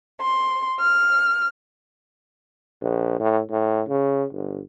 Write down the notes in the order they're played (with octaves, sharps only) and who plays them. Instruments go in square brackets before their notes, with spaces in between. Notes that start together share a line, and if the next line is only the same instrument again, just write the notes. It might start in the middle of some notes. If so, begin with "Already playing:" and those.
[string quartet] C6
F6
[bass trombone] A#1
A2
A2
C#3
G1